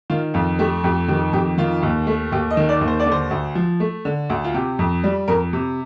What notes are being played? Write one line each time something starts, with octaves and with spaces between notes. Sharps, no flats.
D#3 F4
F2 F4
A3 G4
F2 G4
D#3 G4
F2 G4
D#3 F4
D#2
A3
D#2 G4
D#5
D#3
D5
D#2
C5
D5
D3
C5
D2
F3
A3
D3
D2
F4
C3 G4
F2
G3
F2 A#4
C3